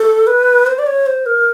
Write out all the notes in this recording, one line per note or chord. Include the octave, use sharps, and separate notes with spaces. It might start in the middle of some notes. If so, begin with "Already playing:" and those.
Already playing: A4
B4
C5
D5
C#5
C5
A#4